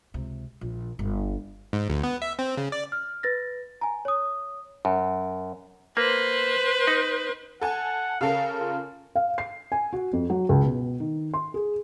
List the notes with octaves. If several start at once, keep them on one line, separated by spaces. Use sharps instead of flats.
C#2 C3
A#1
G1 B3
G#2
D2
B3
E5
C4
C#3
D5
F6
B4 A6 A#6
G#5 A#5
C#5 D#6
F#2
A#3 B4 C5
D#4
A4 F#5 G#5 A5
C#3 A4 A#4 F5
F4
F5
C7
G#5
F#4
F2
F#3
C#2
B2
D#3
C6
G#4